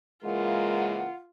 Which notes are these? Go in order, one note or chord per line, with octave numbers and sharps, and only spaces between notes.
C#3 E3 G#3 A#3 F4 F#5